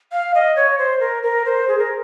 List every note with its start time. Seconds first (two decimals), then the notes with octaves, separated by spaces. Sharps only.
0.12 F5
0.34 D#5
0.56 C#5
0.78 C5
1.00 A#4
1.23 A#4
1.45 C5
1.68 G#4
1.79 A#4